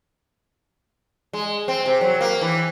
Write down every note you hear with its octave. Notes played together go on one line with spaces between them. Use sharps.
G#3
C4
C3
F#3
A#3
E3